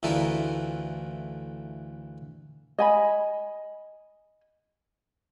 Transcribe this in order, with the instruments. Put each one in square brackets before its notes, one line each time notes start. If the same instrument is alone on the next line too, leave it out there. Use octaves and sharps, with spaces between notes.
[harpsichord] D2 E3 A3 E4 F4 A#4
[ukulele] D#5 G#5 B5